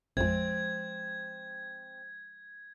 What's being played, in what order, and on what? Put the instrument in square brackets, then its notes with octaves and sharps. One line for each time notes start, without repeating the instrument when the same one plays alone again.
[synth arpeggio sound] A1 F2 [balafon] F3 G#3 [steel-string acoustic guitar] C4 [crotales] G#6